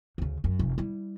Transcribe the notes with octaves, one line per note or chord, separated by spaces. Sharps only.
D2 C#3
F#2
F1
G3 E4